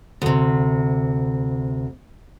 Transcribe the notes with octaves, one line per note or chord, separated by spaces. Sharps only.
D2 C3